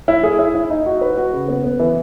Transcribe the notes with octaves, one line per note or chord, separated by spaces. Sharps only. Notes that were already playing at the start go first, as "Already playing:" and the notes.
E4
G#4
E4
E4
D#4
F#4
B4
F#4
C#3
B3
B3
E3